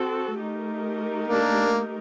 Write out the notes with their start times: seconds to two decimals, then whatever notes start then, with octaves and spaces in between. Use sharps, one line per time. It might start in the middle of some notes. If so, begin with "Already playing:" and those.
Already playing: C4 F#4 A4
0.40 A3 D#4 G4 A#4
1.27 A#3 D4